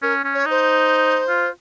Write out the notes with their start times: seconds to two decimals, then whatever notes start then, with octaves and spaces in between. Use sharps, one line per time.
0.02 C#4 A#4
0.24 C#4
0.34 C#5
0.45 D#4 C5
1.28 F4